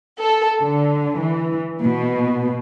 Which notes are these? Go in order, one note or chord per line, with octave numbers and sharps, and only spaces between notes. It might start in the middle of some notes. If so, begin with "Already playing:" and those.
A4
D3
E3
B2